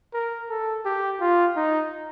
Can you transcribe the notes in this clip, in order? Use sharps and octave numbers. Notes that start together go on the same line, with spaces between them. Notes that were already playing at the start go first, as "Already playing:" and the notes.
A#4
A4
G4
F4
D#4